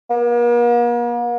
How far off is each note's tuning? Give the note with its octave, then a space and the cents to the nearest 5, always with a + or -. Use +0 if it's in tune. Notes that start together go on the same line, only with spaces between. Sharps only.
A#3 +45